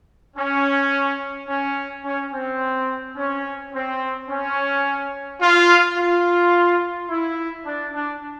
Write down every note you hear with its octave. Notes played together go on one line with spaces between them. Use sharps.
C#4
C#4
C#4
C4
C#4
C4
C#4
F4
F4
E4
D4
D4